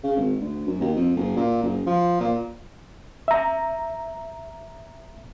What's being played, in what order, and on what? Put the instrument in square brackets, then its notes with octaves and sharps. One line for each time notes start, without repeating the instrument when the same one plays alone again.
[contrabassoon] C#3
G#1
D2
F#2
D#2
F2
F#1
A#2
F#1
F3
A#2
[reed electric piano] E5 A#5